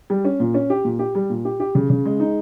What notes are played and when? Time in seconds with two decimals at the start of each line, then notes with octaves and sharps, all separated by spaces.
0.10 G3
0.24 C#4
0.40 A#2
0.54 C#4
0.70 G4
0.85 A#2
0.99 G4
1.15 G3
1.30 A#2
1.45 G4
1.60 G4
1.75 C#3
1.90 C#3
2.05 G#3
2.20 D#4